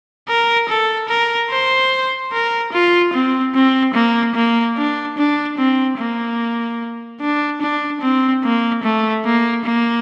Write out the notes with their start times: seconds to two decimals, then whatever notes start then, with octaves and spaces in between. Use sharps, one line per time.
0.29 A#4
0.69 A4
1.09 A#4
1.50 C5
2.32 A#4
2.73 F4
3.14 C4
3.55 C4
3.94 A#3
4.35 A#3
4.77 D4
5.18 D4
5.58 C4
5.98 A#3
7.21 D4
7.62 D4
8.02 C4
8.44 A#3
8.84 A3
9.25 A#3
9.65 A#3